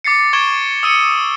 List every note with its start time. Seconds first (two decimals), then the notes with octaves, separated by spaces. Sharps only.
0.04 D6 A6 C7 C#7
0.33 C#6 G#6 A6 D7 E7 G7
0.83 D#6 E6 C#7 D#7 G7